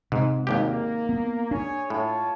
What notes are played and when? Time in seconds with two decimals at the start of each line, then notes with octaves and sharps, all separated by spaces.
0.12 G#2 C3
0.47 G#1 D#2 A#3 G4
1.09 B3
1.51 D4 G#4 C#5 G#5
1.90 A2 F4 C#5 A5